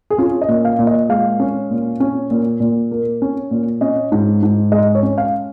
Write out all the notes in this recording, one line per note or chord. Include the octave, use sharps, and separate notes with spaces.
G#4
C#4 F4
D#5
A#2
F5
A#2
D#5
G#3 F5
C#4
A#2
C#4
A#2
A#2
A#3
C#4
A#2
C#4 D#5
G#2
G#2
G#3 D#5
C#5
C#4
F5